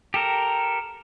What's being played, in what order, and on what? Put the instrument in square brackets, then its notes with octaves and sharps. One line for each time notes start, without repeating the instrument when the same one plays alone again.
[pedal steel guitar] G4 A4 A#4